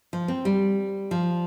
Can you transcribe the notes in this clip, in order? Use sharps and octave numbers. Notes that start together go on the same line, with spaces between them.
F3
C4
G3
F3